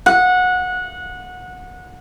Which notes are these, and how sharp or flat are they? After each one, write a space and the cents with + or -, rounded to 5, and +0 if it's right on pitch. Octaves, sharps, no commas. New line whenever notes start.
F#5 -20